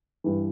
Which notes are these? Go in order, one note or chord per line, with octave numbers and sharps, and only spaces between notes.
G2 E3